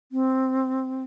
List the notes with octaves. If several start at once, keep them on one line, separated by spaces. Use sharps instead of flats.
C4